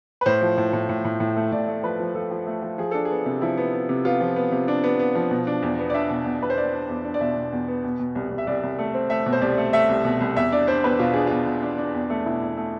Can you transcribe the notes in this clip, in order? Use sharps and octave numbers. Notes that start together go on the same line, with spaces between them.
B4
A2 C5
F3
A2
A2
A2
A2
A2
A3
A2 D5
A3
F3 B4
F3
F3 A4
F3
A3
F3
F3 G#4
D4 A4
B3 G#4
C3
F3 E4
B3
B3
C3
B3 F4
F3
B3
C3
D4
B3
B3
F3
B2
D4
E2
B3
D5
D4 E5
B2
B2
E2 B4
C5
D4 D5
D4
E2
D4
D5
B2 E5
B2
E2
B3
B2
B2
C2
C2
E5
C2 D5
C2
A3
C4
A3 E5
B2
C5
C2 D5
A3
A3 E5
C2
B2
C2
E2 E5
D4 D5
D4 C5
E2 B4
B2 F4
D4 G#4
B2 F4
B2
D4
D4
E2
A3
B2 E4
E2
A3